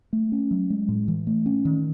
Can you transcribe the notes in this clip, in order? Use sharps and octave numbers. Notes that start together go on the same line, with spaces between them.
A3
C#4
F#3
G#3
A2
E3
A3
C#4
D#3